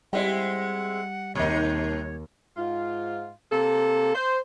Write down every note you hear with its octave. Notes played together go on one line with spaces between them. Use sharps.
G3 G#3 C4 E4 F#5
D#2 B2 D#3 D#4 C#5
G#2 F4
C3 A#3 A4
C5